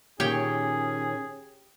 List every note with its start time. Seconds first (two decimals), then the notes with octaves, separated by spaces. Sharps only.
0.20 A#2 D#3 C#4 G4 G#4 C#5 G5